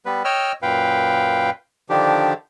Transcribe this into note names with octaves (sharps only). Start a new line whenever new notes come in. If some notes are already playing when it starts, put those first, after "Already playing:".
G3 B3 B4
C#5 D#5 G5 E6 F6
F#2 A#2 B4 F5 G5
D3 D#3 F3 D4 G4